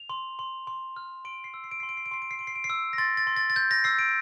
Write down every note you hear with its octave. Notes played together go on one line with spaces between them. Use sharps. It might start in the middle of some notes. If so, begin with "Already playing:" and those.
Already playing: F7
C6
C6
C6
F6
C6 D7
C7
E6
C7
D7
C6 C7
D7
C7
D7
C6 C7
D7
C7
C6 D7
C7
D7
C7
E6
A#6
C6 A6
A6
C6
A6
A6
G6
A#6
E6 C7
D7